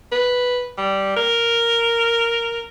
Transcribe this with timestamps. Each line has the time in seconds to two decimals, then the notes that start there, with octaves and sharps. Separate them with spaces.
0.12 B4
0.78 G3
1.17 A#4